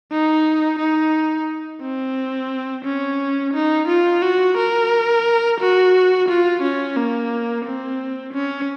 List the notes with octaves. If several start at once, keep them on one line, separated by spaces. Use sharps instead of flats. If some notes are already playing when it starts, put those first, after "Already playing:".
D#4
D#4
C4
C#4
D#4
F4
F#4
A#4
F#4
F4
C#4
A#3
C4
C#4